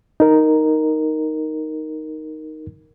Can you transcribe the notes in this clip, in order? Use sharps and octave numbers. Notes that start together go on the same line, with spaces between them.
D#4 A#4